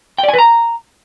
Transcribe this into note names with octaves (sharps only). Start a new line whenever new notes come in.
G5
D5
G#5
B4
A#5